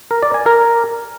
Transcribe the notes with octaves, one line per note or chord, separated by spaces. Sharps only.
A#4
D5
G#5
A#4